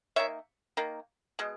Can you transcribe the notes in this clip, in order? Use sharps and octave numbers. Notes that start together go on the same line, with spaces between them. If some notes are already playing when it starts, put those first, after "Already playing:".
D#3 A#3 C#5 E5
D#3 A#3
B2 G#3